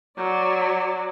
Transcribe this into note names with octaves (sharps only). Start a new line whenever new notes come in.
F#3 D5